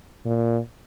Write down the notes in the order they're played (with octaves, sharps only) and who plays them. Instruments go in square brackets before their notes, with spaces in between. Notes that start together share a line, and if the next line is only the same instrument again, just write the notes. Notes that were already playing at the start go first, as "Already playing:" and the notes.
[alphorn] A#2